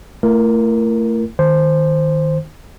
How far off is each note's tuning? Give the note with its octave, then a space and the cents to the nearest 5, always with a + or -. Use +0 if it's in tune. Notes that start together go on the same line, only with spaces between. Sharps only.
A3 +30 E4 +35 A#4 +10
D#3 +0 C5 +0